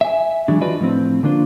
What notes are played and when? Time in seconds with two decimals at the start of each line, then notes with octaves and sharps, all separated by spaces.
0.01 E5 G#5
0.48 E3 F#3 G#3 D4
0.61 D4 F4 F#4 B4 D5 D#5
0.80 A2 F3 C4
1.23 D3 A#3 D4 F4 C5